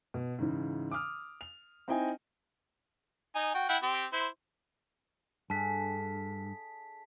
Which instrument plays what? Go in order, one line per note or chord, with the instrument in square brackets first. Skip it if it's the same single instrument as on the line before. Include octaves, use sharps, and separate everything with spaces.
[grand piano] B2
G#2 C#3 E3
D6 D#6 F6
F7
C4 D#4 E4 D#5 G5 G#5
[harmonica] D#4 G#5
F#4 G5
E4 F#5 G5
C4 G4
E4 C5
[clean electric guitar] G2 [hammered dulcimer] D4 G#4 A4 [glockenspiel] A5 B6